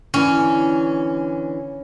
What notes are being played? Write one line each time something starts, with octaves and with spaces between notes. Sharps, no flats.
D3 E3 C#4